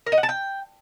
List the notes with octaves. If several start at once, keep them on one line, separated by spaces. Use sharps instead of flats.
A#4
D#5
F#5
A5
G5